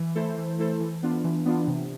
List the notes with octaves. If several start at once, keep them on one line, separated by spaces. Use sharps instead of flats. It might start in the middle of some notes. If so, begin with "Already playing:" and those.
Already playing: E3
A3 E4 A4 C5
E3
A3 E4 A4 C5
E3
B3 D4 F4
E3
B3 D4 F4
C3